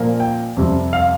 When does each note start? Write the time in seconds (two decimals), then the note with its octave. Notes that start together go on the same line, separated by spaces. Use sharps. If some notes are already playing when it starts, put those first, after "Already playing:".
Already playing: A#2 F3 A#3
0.20 G5
0.56 F2 C3 G3
0.93 F5